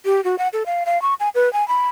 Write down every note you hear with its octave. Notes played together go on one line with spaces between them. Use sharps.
G4
F#4
F#5
A4
F5
F5
C#6
G#5
B4
G#5
B5